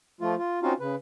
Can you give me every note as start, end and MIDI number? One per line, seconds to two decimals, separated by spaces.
0.21 0.35 53
0.21 0.35 57
0.21 0.35 65
0.39 0.59 65
0.63 0.73 60
0.63 0.73 61
0.63 0.73 63
0.63 0.73 65
0.63 0.73 66
0.63 0.73 77
0.80 0.95 49
0.80 0.95 71